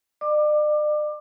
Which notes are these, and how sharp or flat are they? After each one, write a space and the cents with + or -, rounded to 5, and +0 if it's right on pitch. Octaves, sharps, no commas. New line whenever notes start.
D5 +45 D6 +20